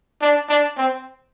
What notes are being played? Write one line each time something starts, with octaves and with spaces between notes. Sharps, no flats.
D4
D4
C4